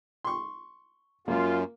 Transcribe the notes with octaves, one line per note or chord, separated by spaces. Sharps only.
C6 C#6
F#2 A#3 F4